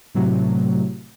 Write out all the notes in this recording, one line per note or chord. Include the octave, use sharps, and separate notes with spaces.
A2 C3 F#3 A3